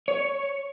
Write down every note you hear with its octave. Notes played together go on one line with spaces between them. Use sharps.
C#5